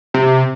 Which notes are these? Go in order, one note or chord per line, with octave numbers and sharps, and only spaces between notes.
C3